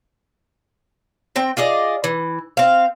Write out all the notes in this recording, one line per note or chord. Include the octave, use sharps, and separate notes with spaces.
C4 G5
F4 G#4 D5 D#5
E3
C4 F5